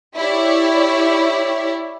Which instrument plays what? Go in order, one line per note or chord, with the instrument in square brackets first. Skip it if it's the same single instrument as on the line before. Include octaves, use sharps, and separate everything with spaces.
[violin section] E4 G4 C#5 D5 E5